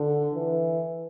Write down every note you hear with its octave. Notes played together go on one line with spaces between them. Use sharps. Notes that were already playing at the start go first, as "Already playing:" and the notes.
Already playing: D3
E3